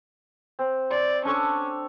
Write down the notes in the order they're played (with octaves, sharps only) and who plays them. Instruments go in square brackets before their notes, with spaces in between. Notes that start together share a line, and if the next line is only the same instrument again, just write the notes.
[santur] C4
[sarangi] D5 [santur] C6
[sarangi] C#4 [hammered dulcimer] D4 A4 C#5